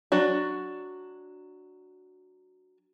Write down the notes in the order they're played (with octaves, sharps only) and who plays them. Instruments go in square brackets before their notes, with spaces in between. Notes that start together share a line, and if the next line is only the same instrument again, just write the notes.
[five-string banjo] F#3 D4 F#4